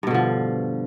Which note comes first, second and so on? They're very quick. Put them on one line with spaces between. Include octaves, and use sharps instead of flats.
G2 B2 D3 F3